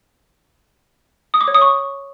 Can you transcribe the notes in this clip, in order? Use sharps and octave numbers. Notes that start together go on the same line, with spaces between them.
D#6
D6
C#5
D#6
C#6